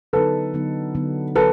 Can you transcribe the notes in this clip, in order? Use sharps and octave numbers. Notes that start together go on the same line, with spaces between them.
D3 F#3 B3 D#4 A4 B4
D3 F#3 B3 D#4
D3 F#3 B3 D#4
D3 F#3 A4 B4